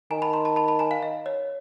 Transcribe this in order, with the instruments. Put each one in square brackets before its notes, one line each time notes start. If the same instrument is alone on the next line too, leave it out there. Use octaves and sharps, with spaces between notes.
[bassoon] D#3 [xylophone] G#5 A#5
[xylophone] A5 B5
A#5 C6
A5 B5
A5 B5
A5 B5
G#5 A#5
F5
D#5
C#5